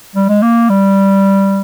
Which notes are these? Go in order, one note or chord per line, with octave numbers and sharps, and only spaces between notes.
G3
G#3
A#3
G3